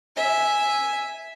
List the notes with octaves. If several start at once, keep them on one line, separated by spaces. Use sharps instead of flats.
E5 G#5